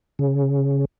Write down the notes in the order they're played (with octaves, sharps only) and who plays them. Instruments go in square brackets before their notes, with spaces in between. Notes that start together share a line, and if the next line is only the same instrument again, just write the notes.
[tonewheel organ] C#3